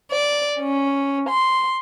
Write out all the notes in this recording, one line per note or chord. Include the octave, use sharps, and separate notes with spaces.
D5
C#4
C6